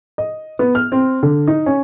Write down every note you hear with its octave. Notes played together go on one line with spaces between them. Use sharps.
D#5
B3
F6
C4
D3
D#4
C#4